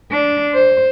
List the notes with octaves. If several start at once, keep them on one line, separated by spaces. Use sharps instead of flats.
D4
C5